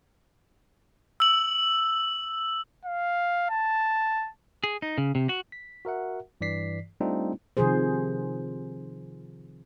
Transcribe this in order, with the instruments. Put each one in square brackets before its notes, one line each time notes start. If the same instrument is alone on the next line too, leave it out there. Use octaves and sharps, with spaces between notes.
[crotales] E6 F#7
[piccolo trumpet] F5
A5
[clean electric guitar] G#4
D#4
C#3
C3
F#4
[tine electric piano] B6
F#4 A#4 E5 F#5
G2 E3 D5 B6 C7
G3 A3 C4 D4 D#4 F4
[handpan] C3 D#3 F3 G#4 C5